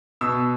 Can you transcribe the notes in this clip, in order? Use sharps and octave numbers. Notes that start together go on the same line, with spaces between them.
B2 E6